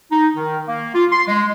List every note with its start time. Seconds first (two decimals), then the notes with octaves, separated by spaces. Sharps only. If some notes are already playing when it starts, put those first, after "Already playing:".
0.12 D#4
0.36 D#3
0.67 A#3
0.95 F4
1.12 C6
1.28 G#3